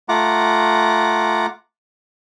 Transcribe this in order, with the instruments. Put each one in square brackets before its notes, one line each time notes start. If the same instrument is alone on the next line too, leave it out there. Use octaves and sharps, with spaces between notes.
[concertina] A3 F4 F#5 A#5 D6